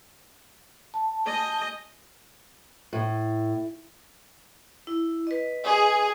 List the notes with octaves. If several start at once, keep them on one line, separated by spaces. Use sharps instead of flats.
A5
D#5 G#5 G6
A2
E4
B4 D#5
G#4